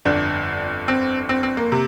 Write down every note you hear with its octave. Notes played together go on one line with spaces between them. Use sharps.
G1 F2 D3 D4
C4
C4
C4
A#3
C3